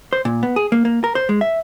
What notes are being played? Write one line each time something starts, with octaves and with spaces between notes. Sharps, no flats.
C5
A#2
B3
G#4
A#3
A#3
A#4
C5
G#3
E5